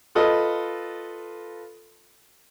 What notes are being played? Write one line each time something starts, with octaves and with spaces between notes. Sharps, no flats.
F4 A4 B4 D#5